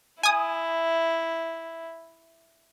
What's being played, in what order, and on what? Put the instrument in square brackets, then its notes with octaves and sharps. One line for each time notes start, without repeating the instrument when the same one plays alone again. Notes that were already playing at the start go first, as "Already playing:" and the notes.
[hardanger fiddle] E4 [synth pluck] G#5 D#6